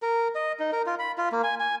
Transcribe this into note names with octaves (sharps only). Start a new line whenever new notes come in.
A#4
D#5
D#4
A#4
F4
B5
F4
A#3
G#5
G#5